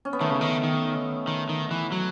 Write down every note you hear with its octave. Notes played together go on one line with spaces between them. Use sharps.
C#4
B3
D#3 A3
C#3
D#3
D#3
D#3
D#3
E3
F#3